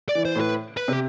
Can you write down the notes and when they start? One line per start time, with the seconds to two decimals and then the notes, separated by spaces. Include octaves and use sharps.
0.09 D5
0.15 E3
0.25 C5
0.36 A2 B4
0.77 B4
0.88 C3 G4